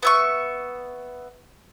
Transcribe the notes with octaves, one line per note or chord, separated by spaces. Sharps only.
B3 E5 C#6